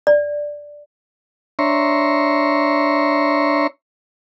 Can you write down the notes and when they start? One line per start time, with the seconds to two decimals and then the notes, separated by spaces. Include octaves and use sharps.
0.07 D5
1.59 D4 C#5 E5 A#5 C6 C#6